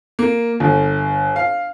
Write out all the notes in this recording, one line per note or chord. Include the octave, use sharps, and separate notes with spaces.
A#3
G1
F5